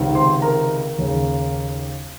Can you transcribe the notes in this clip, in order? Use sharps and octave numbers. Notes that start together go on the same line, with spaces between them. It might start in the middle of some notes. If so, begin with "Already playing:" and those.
Already playing: C#2 C3 D#3
C5 C6
A#4 A#5
D#2 C#3